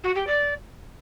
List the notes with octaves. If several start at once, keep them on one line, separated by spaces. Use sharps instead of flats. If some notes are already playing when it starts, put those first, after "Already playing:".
F#4
G4
D5